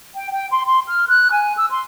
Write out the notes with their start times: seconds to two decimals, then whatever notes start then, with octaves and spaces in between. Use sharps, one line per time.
0.15 G5
0.30 G5
0.51 C6
0.64 C6
0.87 F6
1.07 F#6
1.30 G#5
1.57 E6
1.70 C6